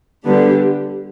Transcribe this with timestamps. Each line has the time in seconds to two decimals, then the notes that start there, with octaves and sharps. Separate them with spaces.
0.25 D3 G3 B3 D4 G4